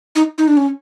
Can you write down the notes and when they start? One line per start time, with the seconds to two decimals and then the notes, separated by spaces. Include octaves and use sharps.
0.15 D#4
0.38 D#4
0.48 D4
0.57 C#4